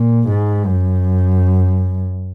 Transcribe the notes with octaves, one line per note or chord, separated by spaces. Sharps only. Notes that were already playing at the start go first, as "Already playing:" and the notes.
Already playing: A#2
G#2
F#2